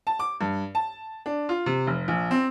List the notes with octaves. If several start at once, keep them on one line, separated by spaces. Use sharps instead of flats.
A5
D6
G2
A5
D4
F4
C3
F1
A#1
C4